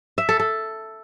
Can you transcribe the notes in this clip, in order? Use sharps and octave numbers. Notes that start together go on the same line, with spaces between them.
E5
A4
A4